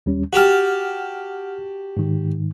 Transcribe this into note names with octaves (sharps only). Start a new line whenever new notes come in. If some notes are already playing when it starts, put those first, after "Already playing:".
D#2 G3 C#4
F#4 G4 F#5 A5 F6
G#2 D#3